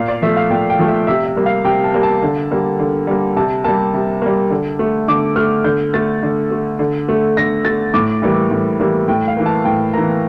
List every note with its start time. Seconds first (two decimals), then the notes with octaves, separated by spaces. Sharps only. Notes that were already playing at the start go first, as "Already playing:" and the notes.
Already playing: A#2 F5
0.08 D5
0.22 F3 A3 E5
0.37 F5
0.50 A#2 G5
0.70 G5
0.79 F3 A3
0.88 E5
1.07 C3 E5
1.26 E5
1.36 G3 A#3
1.46 F5
1.64 C3 G5
1.84 A5
1.94 G3 A#3
2.03 A5
2.23 D3
2.51 G3 A#3
2.79 D3
3.07 G3 A#3
3.36 C3 A5
3.64 G3 A#3 A5
3.94 C3
4.22 G3 A#3
4.50 D3
4.79 A3
5.08 D3 D6
5.36 A3 F6
5.64 D3 G6
5.94 A3 A6
6.23 D3
6.51 A3
6.79 D3
7.09 A3
7.37 D3 A#6
7.65 A3 A6
7.94 A2 D6
8.22 E3 G3 A#3
8.51 A2
8.80 E3 G3 A#3
9.08 A2 G5
9.28 F5
9.37 E3 A#3
9.46 A5
9.65 A2 G5
9.94 E3 A#3 A#5